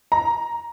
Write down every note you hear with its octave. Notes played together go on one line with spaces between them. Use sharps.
A#5